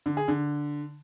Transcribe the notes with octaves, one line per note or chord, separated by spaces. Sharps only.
D3
G#4
D3